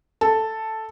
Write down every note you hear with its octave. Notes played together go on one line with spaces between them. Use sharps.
A4